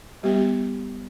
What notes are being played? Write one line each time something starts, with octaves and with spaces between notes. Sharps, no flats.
G3 B3 G4